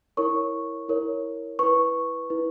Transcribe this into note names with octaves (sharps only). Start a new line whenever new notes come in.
E4 A#4 C#5 C#6
E4 A#4 C#5
E4 B4 C#6
E4 B4